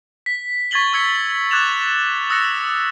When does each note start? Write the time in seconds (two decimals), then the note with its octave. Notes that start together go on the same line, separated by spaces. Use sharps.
0.26 B6
0.71 C#6 G#6 A6 B6 F#7 G7
0.93 C#6 E6 G#6 C#7 G7
1.51 D6 F#6 G#6 A6 E7 F7
2.30 D#6 E6 F#6 A#6 C#7